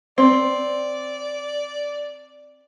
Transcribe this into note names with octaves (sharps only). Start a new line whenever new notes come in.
C4 D5